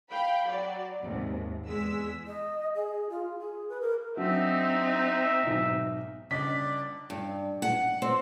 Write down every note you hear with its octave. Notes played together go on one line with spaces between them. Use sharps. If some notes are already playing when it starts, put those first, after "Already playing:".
F5 G5 B5
F#3 D5
D#2 G#2 C3
E2 G#3 E6 B6
D#5
G#4
F4
G#4
B4
A#4
F#3 C4 D4 D#4 E5
B1 G#2
G1 C#3 D4 D5 D#5 B6
G2
F#5
C4